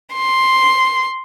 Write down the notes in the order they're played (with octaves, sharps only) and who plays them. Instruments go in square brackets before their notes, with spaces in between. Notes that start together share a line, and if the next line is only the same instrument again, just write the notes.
[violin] C6